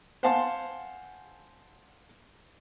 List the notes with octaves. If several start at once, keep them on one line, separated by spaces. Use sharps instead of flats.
C5 F5 F#5 G#5 A5 C6